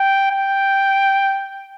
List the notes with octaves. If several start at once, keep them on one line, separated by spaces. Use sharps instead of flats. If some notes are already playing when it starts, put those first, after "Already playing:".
Already playing: G5
G5